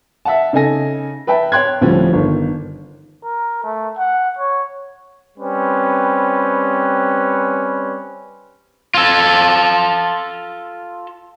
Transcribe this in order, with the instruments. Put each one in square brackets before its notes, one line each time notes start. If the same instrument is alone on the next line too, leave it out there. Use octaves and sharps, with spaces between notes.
[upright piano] E5 F#5 A5
C#3 D#4 A4 G#5 A#6
B4 E5 G5 A5
C#5 G5 C6 F#6 G#6
D2 A2 F3 G3 C#4
G1 D#3
[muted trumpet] A#4
A3
F#5
C#5
[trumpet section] G3 C4 C#4 B4
[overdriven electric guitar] F4 A4